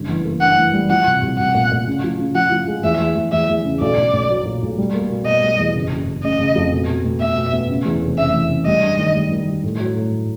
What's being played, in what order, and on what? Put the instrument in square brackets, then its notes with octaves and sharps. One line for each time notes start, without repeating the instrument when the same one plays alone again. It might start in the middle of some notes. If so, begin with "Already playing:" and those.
Already playing: [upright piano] F#1 G2
E3
A#3
[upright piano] G2 [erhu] F#5
[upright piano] E3
G3
[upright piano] F3 [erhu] F#5
[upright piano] C2
C2
[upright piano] C2 [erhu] F#5
[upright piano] A#2
A#2
C#3
F3
C#3
[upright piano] F3 [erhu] F#5
[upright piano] F3
G#3
[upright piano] E2 [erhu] E5
[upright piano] E2
E2
[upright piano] E2 [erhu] E5
[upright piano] E2
C#3
[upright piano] B1 [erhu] D5
[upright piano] B1
B1
F#3
A#2
B1
G3
A#3
B2
[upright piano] B2 [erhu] D#5
[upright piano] G3
E2
F#1
F#1
F#1
[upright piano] C#3 [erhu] D#5
[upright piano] C#3
F2
B2
B2
B2
[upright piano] B3 [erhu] E5
[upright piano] B2
B3
C#3
E2
F1
[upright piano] C#3 [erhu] E5
[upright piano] E3
C#3
[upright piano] G3 [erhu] D#5
[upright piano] G2
D#3
G3
D#3
G3
A2
F#3
A2